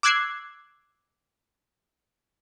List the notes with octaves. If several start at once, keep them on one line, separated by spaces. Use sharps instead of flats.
D6 E6 F#6 G#6 C7